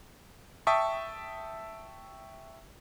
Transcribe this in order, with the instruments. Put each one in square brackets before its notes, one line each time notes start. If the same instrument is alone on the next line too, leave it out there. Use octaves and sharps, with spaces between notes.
[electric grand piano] E5 G5 A5 C#6 D#6